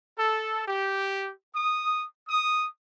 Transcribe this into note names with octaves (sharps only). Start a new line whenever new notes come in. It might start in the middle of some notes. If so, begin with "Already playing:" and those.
A4
G4
D#6
D#6